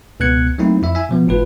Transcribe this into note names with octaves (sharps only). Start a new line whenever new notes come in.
C#2 B2 B3 F#6 G#6 C#7
F#3 A3 A#3 C4 D#4 E4
F2 E4 E5
E5 G#5
B2 F3 B3
G1 A2 F4 B4